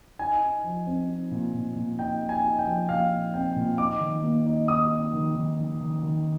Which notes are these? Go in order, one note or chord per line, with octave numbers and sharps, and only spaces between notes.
D#4 G#5
D#4
F3
C4
D#4
A#2
A#2
A#2
D#4 G5
D#4
G#5
D#4
G5
F3
A#2 F5
D#4
C4 G5
A#2
D#4 D6
D#3
A#3
D#4
D#4 D#6
D#4
D#3
D#3
D#3
D#3
D#3